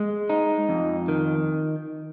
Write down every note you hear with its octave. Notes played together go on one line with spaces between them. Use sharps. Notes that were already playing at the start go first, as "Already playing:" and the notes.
Already playing: G#3
D#4
F2
D#3